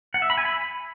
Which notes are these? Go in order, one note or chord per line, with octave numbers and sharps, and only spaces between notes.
F#5
E5
B5
G#5
B5